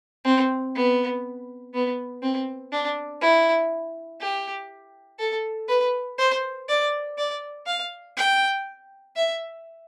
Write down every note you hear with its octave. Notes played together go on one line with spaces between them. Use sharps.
C4
B3
B3
C4
D4
E4
G4
A4
B4
C5
D5
D5
F5
G5
E5